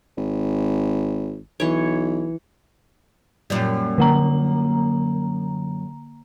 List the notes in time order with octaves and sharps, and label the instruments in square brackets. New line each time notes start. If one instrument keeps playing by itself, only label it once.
[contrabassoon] G#1
[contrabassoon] B1 [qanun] E3 C#5
[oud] F#2 A#2 G3
[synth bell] D3 A#3 A#5